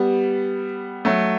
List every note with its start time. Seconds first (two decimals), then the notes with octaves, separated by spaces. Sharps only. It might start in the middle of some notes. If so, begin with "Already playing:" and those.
Already playing: G3 B3
1.05 F#3 A3